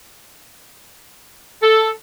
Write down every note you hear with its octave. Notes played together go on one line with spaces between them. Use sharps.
A4